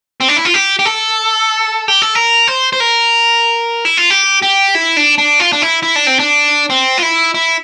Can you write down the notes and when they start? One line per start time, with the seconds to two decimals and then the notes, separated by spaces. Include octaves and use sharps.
0.21 C4
0.28 D4
0.37 E4
0.45 F4
0.54 G4
0.79 G4
0.85 A4
1.88 G4
2.02 A4
2.15 A#4
2.48 C5
2.73 C5
2.80 A#4
3.85 E4
3.97 F4
4.10 G4
4.42 G4
4.75 E4
4.97 D4
5.18 D4
5.40 F4
5.53 D4
5.62 E4
5.83 E4
5.96 D4
6.07 C4
6.19 D4
6.70 C4
6.98 F4
7.03 E4
7.34 E4